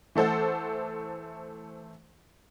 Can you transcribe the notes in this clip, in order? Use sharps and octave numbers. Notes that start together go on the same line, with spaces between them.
E3 A3 A4 C5 F#5